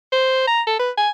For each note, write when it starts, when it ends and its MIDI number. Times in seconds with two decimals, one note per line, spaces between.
0.12 0.46 72
0.47 0.62 82
0.67 0.77 69
0.79 0.91 71
0.98 1.10 80